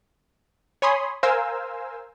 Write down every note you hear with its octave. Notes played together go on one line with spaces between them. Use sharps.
C#5 G#5 B5 C6 D#6
A#4 C5 F5 G#5 E6